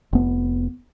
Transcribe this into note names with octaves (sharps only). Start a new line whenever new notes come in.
F1 B3